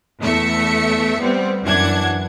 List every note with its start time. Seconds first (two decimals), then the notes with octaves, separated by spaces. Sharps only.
0.22 E2 A3 E5 C#7
1.20 G3 B3 C4
1.64 F#2 E3 D4 F#5 G#6